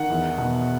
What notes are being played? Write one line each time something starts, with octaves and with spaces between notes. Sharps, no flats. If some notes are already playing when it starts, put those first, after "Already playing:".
Already playing: D#3 F#5
E2
B2